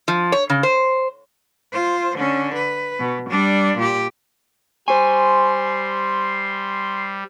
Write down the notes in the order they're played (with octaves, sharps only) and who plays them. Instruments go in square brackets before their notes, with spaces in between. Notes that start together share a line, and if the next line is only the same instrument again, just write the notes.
[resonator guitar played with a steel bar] F3
C#5
C#3
C5
[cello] F4 C5
D3 C#4
B4
B2
G3 D4
A#2 G4
[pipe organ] G3 [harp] C5 C#6 [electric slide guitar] G#5 [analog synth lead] C6